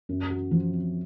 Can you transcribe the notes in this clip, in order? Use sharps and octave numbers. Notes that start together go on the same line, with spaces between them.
F#2
F#4
F3
C4